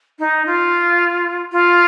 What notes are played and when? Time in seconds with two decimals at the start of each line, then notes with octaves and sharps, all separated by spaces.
0.19 D#4
0.46 F4
1.51 F4